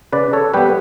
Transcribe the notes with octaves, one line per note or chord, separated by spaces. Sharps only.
C#3 B4 D5
A4 C#5
G3 B3 G4 B4